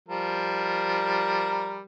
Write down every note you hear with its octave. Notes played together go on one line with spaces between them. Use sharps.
F3 G3 A#4